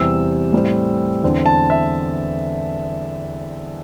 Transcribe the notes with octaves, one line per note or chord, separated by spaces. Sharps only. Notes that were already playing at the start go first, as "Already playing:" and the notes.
Already playing: E2 C3 G3 C4 E6
A2 G3 C4
E2 D3 C4
A5
E5